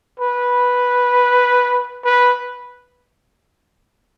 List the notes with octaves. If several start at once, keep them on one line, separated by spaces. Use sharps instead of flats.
B4
B4